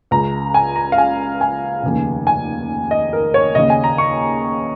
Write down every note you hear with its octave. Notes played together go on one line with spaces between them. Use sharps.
C#2 C#3 A#5
G#5
A#5
F5
G#5
G#5
F1 D#2 C#3
G#5
D#5
A#4
C#5
D#2 C#3 D#5
G#5
A#5
C#6